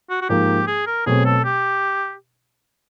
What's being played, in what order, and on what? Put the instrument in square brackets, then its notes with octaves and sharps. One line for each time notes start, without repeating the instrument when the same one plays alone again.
[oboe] F#4
F#4
[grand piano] G#2 F3 A#3 [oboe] G4
[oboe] G#4
A#4
[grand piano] B2 F#3 A3 C4 [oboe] G#4
[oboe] A4
G4